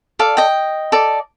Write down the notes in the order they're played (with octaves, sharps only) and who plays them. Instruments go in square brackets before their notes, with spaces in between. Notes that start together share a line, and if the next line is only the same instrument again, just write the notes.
[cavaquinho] A4 D5 F5
D#5 G5
A4 D5